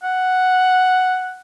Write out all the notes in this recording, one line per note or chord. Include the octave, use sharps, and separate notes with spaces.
F#5